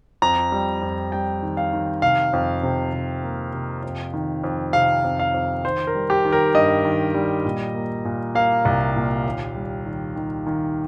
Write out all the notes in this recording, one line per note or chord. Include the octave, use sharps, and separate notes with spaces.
F2 A#5
G3
F2
G3 G5
D#3
F5
D#3
C3 F5
F2
C3
C3
A#3
C3
F2
D#3
F2
C3 F5
F2
F5
F2
D#3 C5
A#4
G3
G4
D#3
A#4
G2 D#5
D#3
G3
A#2
A#3
A#2
A#3 F5
C2
A#2
D#2
G3
D#3
D#3
D#3